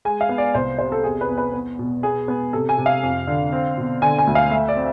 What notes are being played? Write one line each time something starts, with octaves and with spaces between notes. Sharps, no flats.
G#3 G#5
F5
B3
D5
C2 C5
C3 C5
A4
E2 G#4
B4
E2
B4
B3
B2
B3 G#4
B3
C3 A4
G#5
C3
F5
F2
D3
C4
B2
D3 G#5
G#5
D2
F5
A3 E5
D5
C4